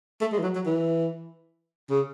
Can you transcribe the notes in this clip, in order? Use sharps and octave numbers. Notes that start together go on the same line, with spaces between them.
A3
G#3
E3
F#3
F#3
E3
C#3